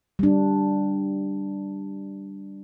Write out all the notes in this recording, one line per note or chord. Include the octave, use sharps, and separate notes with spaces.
G3 D4